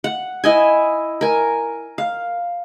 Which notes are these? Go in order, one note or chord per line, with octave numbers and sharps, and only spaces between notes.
F#5
E4 D#5 G#5
A#4 G#5
F5